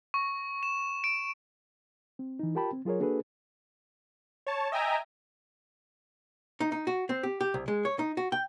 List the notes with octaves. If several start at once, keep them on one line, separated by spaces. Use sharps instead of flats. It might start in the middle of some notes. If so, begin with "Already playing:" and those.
C#6
E7
D7
C4
E3 D#4
F4 G4 A#4 G5 A5 B5
C4
F#3 F4 G#4 A#4 C#5
A#3 D4 F#4 G#4 A4 B4
C#5 A5
D#5 E5 G5 G#5 A#5
D#4
D#4
F#4
C4
G4
G4
C2
G#3
C#5
D#4
F#4
G5